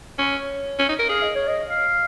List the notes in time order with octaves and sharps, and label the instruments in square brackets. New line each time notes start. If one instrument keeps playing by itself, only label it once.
[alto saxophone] C#4 [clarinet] C#5
[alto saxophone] C#4
D#4
A#4
[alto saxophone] G#4 [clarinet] F5
[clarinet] D#5
C#5
D#5
F5